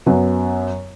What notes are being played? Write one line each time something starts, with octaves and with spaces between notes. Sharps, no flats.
F#2 F#3 B3